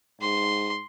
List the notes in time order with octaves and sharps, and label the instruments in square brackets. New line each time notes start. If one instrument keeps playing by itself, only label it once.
[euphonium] G#2 [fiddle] C6